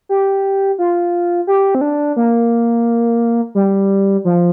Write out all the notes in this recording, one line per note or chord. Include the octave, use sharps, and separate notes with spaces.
G4
F4
G4
C4
D4
A#3
G3
F3